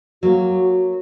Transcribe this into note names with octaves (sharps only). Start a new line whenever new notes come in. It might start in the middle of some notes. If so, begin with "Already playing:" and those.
F#3 A#3 F#4